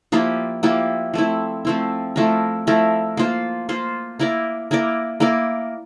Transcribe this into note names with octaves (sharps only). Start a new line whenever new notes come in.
F3 A#3 E4 G4
F3 A#3 E4 G4
F3 A3 C4 E4
F3 A3 C4 E4
F3 A3 E4 A#4
F3 A3 E4 A#4
A#3 F4 C5
A#3 F4 C5
A#3 E4 A#4 D5
A#3 E4 A#4 D5
A#3 E4 A#4 D5